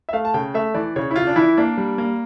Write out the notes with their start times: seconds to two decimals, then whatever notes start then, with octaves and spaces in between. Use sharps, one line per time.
0.09 E5
0.13 A3 F5
0.25 A5
0.34 C#3 G5
0.54 A3 E5
0.74 E3 D5
0.96 C#3 C#5
1.11 E4
1.16 C#3 F4
1.27 D4
1.36 E3 E4
1.57 A#3 D4
1.77 G3
1.98 A#3